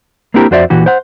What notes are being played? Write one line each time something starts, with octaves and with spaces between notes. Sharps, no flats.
A#3 C4 D4 E4 G4 A#4
F2 F#4 C5 D5 E5
A#2 E3 F#4 G4
C5 F#5